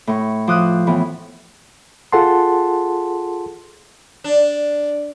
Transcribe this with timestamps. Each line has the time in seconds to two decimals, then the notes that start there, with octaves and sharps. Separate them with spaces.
0.07 A2 C#6
0.47 F3 D6 D#6 F#6
0.87 A2 E3 B3
2.12 F4 G#4 A4 F#5 A5 C6
4.24 D4